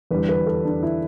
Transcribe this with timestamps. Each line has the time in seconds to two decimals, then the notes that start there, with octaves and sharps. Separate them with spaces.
0.11 E2 D3 G3 B4
0.29 B4
0.47 A4
0.65 D4
0.83 E4